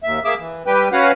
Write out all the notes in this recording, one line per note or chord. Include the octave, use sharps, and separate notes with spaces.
D#2 E5
A#3 G#4 E5 D6 E6
E3
G3 G4 B4 G5
C#4 F#4 B4 C#5 F5 F#5